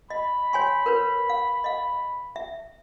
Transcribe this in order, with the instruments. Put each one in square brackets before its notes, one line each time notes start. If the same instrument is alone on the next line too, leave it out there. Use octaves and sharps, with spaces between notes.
[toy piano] D#5 [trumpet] B5
[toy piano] C#5 G#5 C6
A#4 B4 C#5
F5
D#5 F5
E5